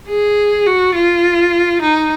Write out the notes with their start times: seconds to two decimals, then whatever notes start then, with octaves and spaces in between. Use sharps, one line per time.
0.09 G#4
0.66 F#4
0.95 F4
1.82 D#4